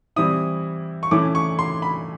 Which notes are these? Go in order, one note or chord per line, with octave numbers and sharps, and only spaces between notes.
E3 G3 C4 E4 D#6
C#6
E3 A3 C#4 E4 D6
C#6
C6
B5